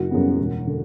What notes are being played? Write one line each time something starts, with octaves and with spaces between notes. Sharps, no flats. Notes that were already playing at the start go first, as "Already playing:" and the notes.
Already playing: F#1 F#4
F#2 C#3 G3 B3
E1
D3